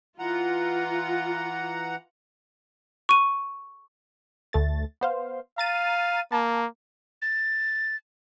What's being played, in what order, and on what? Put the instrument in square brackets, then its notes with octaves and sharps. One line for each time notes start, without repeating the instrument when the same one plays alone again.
[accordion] E3 F#5 A#5 [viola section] F4
[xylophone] C#6 D#7
[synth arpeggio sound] D2 A3 A6
B3 C5 F5
[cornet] F5 [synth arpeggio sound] A#5 A6 D#7
[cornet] A#3 [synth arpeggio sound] A5
[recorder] A6